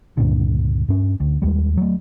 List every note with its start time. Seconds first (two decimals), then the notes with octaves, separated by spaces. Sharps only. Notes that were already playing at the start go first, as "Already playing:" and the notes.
0.17 C#2 G2 A#2 D3
0.88 G2 C#4
1.20 D2
1.42 D#2 G3 G#3
1.77 F#3 A3